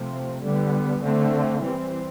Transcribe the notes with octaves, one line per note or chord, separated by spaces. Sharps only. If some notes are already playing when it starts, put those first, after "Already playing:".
Already playing: C3 F3 A3 C4
D3 G3 B3
D3 A3 C4
E3 G3 C4